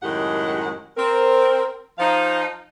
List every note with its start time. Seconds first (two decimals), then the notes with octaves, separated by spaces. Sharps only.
0.03 F#2 A2 D#3 G#3 G4 F#5
0.97 C4 A#4
1.99 F3 D#4 F5